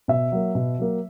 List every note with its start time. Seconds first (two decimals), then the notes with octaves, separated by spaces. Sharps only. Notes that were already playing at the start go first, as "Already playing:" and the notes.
0.08 B2 E5
0.32 F#3 A#3
0.55 B2
0.78 F#3 A#3